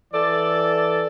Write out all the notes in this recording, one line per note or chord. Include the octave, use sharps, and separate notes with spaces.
E3 A4 D5